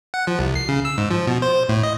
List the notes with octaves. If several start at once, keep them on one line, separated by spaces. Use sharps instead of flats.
F#5
F3
C2
C7
C#3
E6
G#2
F3
B2
C5
A2
D#5